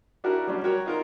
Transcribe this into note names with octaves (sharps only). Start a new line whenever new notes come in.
D4 E4 F#4 G4 A#4
F#3 G3 C#4 D4
F#4 A#4 C#5 G5
D#4 F4 A#4